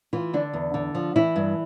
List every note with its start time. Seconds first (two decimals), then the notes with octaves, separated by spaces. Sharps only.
0.13 E3 F4
0.33 D3 D4
0.53 E2
0.74 D3
0.95 F3
1.16 E3 E4
1.36 G2